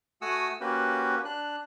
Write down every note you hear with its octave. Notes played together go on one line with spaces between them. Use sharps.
A3 F#4 F#5 G#5 D#6 E6
A#3 C#4 F#4 G4 B4
D4 F#6